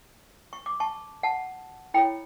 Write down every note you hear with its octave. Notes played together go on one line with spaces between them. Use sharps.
C#6
D6
A5 C#6
F#5 A5
E4 A4 C#5 G5 B5